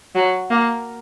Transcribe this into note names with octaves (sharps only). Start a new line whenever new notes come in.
F#3
A#3